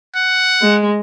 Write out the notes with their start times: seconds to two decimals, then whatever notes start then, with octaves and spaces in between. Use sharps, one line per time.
0.15 F#5
0.62 G#3